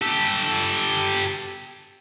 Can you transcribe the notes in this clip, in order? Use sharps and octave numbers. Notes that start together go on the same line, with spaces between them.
G4 A4